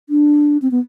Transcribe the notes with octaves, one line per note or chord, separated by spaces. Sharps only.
D4
C4
B3